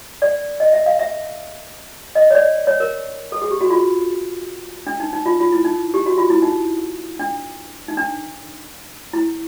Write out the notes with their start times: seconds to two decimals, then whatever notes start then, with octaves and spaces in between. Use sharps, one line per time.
0.22 D5
0.60 D#5
0.73 E5
0.86 F5
0.99 E5
2.15 D#5
2.31 C#5
2.35 D5
2.67 C#5
2.80 A#4
3.32 A4
3.42 G#4
3.51 G4
3.61 F#4
3.70 F4
4.87 D4
5.00 D#4
5.13 D#4
5.26 F4
5.40 F4
5.52 E4
5.65 D#4
5.94 G4
6.06 F#4
6.18 F4
6.30 E4
6.42 D#4
7.19 D4
7.88 D#4
7.97 D4
9.13 E4